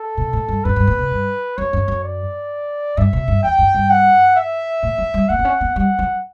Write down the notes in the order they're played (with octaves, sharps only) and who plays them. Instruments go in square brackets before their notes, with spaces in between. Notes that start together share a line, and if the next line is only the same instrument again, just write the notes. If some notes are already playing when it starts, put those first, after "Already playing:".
Already playing: [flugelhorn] A4
[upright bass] B2
A2
G2
[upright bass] F#2 [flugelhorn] B4
[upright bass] G2
A2
B2
G2
[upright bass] F#2 [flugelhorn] C#5
[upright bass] F#2
F#2
[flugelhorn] D5
[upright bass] G2 [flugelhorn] E5
[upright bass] B2
G2
[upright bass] E2 [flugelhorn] G5
[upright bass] F#2
G2
[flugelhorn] F#5
E5
[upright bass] A2
F#3
G3
[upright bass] A3 [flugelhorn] F#5
[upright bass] B3
C#4
B3
[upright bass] G3 [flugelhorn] F#5
[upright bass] F#3